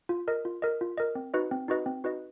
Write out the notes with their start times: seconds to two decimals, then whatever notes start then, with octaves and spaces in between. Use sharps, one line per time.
0.09 F4
0.28 A#4 D#5
0.45 F4
0.62 A#4 D#5
0.81 F4
0.98 A#4 D#5
1.15 C4
1.34 D#4 F#4 B4 D#5
1.51 C4
1.68 D#4 F#4 B4 D#5
1.86 C4
2.04 D#4 F#4 B4 D#5